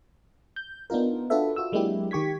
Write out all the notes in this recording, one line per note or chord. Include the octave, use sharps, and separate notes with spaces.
G6
B3 D4 D#4 F4 A#4
D4 F4 F#4 A4 B4 E5
F4 F#4 E6
F#3 G#3 A#3 D4 E4 G4
D#3 G4 C#6 G#6 B6